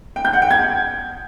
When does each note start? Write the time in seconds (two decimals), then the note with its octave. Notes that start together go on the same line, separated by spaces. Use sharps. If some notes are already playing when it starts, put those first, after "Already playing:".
0.16 G5
0.25 G6
0.33 F#5
0.42 G5
0.51 G#6